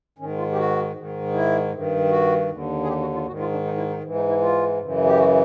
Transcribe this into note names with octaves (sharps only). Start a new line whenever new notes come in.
G#2 D#3 C#4
F4
G4
F#4
G#2 D#3
E4
G2 D#3
F#4
D#2 D3
G#4
G4
F#4
F4
G#2 D#3 F#4
F4
D4
D#4
E4
D#4
G#2 E3
D#4
E4
F4
F#2 C#3 E3
G4
F#4